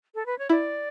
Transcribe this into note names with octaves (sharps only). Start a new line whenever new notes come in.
A4
B4
C#5
E4 D5